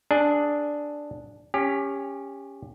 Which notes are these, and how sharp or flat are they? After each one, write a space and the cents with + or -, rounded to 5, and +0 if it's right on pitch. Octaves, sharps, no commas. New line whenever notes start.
D4 +0 G#4 +10
C#4 +0 G4 +25